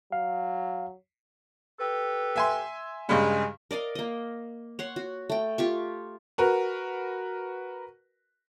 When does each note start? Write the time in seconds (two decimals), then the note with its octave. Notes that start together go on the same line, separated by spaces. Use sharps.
0.12 F#3 F5
1.79 G4 A4 B4
2.36 E5 G#5 C6
3.09 G2 C#3 G3 G#3
3.71 A#4 D5 D#5 F5
3.95 A#3 D#5
4.79 C#5 F#5 C6
4.96 F#4
5.30 A3 G5
5.58 F4 G4 C#6
6.38 F#4 A#4 B4